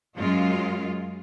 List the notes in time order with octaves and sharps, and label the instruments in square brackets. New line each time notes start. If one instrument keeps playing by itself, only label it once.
[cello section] F#2 G#3 F4